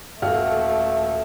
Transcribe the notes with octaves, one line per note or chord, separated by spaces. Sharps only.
D#1 A3 F#4 F5 F6